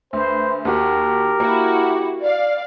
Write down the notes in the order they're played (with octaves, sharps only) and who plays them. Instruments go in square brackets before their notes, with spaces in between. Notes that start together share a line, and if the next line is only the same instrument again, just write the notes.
[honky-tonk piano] D2 [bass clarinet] B4 [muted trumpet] C5
[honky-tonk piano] D#2 F#4 [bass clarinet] G4 [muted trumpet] A#4
[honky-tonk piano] A#3 [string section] E4 F#4
[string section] D5 F5